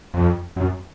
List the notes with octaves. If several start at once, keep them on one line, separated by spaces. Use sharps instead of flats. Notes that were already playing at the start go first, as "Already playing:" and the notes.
F2
F#2